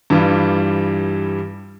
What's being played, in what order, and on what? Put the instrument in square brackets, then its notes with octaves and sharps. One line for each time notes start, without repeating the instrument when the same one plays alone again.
[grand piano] G2 E3 G3 F4